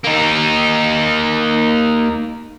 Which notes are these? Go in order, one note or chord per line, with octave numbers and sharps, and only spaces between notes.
A#3 D#4